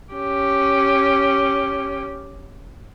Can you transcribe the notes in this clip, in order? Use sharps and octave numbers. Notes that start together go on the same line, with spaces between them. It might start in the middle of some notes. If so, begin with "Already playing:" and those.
C#4 G4